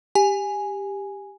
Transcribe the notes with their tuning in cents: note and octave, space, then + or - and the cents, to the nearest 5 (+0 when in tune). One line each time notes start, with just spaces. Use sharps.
G4 +10 G#5 +0